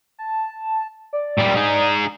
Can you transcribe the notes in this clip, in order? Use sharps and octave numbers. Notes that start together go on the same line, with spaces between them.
A5
D5
A#2 G3
D#4 G#4